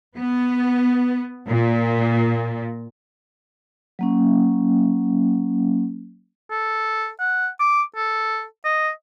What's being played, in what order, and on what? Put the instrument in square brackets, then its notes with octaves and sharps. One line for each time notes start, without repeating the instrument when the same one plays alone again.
[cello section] B3
A#2
[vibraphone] F#3 A#3 C#4
[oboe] A4
F#5
D6
A4
D#5